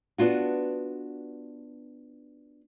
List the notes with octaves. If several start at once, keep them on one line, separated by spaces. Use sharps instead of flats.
B3 D4 F4 F#4